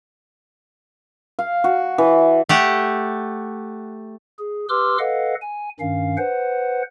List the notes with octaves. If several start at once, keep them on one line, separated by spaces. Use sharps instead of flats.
F5
F#4
E3
A3 G4 F#5
G#4
G4 B4 C6 D6 E6 F6
A4 B4 D#5 F5 F#5
G#5
G2 D#3 C#4 F5
B4 C5 F#5